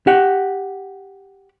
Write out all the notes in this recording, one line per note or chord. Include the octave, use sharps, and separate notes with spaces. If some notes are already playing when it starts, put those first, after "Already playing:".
G4 F#5